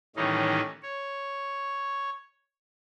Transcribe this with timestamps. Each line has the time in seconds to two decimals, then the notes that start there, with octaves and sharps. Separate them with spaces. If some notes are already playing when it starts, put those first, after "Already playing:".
0.16 A2 D#3 E3 G3 C#4 D#4
0.82 C#5